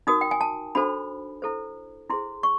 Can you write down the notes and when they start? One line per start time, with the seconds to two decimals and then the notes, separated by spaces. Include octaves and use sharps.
0.07 D#4 F#4 A#4 D#6
0.21 G5
0.31 G#5
0.41 A5
0.75 D4 F#4 A4 C5 B5
1.42 E4 A4 C5
2.10 E4 G#4 C5 C6
2.43 C#6